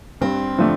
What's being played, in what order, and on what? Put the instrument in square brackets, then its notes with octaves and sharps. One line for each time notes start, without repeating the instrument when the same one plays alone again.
[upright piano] G2 [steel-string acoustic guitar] C4
[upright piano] D3 F3 A3 D4